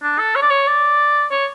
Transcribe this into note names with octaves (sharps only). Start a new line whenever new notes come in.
D4
A4
C#5
D5
C#5
D5
C#5